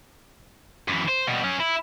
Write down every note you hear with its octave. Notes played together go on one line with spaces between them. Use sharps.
F#2 E3
C5
B2 G3
F#3 C#4
E4